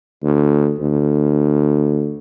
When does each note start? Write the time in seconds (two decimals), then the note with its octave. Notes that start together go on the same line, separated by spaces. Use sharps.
0.23 D2
0.79 D2